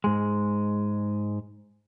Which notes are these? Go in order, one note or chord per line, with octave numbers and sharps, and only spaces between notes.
G#2 G#3